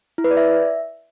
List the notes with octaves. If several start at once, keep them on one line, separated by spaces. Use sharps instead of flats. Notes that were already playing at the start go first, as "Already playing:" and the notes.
E4
B4
D5
E5